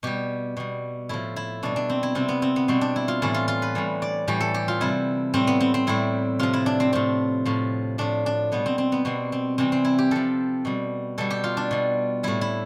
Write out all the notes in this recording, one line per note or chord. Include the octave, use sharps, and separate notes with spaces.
B2 G3 G4
B2 G3
A2 F3 E4
E4
B2 G3 D4
D4
C4
E4
C3 G3 C4
B3
C4
B3
B2 G3 C4
D4
E4
F4
A2 E3 G3 E4
F4
F4
B4
A2 E3 G3
D5
A2 E3 G3 G4
A4
G4
F4
C3 G3 E4
A2 G3 C4
B3
C4
C4
A2 G3 E4
C3 F3 F4
E4
D4
C4
A2 F3 C4
A2 F3
A2 F3 D4
D4
B2 G3 B3
C4
C4
B3
B2 G3 C4
C4
C3 E3 G3 C4
C4
E4
G4
C3 F3 A4
B2 G3
B2 G3 A4
G4
F4
D4
B2 G3
A2 G3 E4
E4